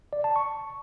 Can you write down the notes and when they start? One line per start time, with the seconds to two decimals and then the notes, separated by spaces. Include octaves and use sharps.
0.13 D5
0.24 A5
0.36 C#6